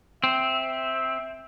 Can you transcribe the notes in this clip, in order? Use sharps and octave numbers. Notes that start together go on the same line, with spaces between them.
C4 E5